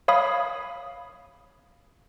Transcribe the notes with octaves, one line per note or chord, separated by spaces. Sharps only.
C#5 F5 B5 D#6